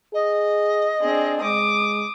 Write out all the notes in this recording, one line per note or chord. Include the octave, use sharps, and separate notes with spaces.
G#4 D#5
C4 D4 G#4
G#3 D6 D#6